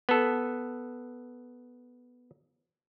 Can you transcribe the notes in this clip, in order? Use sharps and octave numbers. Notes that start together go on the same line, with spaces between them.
B3 A4